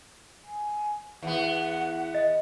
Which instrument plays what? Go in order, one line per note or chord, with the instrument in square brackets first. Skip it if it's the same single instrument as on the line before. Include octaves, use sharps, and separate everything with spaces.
[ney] G#5
[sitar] E2 B3 [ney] F#5
[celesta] D#5